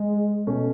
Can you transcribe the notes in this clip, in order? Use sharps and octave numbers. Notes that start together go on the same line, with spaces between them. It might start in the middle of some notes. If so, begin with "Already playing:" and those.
Already playing: G#3
B2 A3 C#4